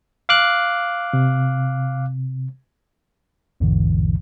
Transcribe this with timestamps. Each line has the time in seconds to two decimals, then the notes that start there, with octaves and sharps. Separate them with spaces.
0.29 F5 D6 F#6
1.13 C3
3.60 A1 E2 G#2 B2 D3 E3